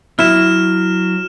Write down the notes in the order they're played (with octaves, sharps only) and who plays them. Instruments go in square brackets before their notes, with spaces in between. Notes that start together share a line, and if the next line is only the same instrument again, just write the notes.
[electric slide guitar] F#3 [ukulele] E4 [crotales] F6 E7